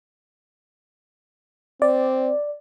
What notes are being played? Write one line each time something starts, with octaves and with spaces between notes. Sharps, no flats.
C4 D5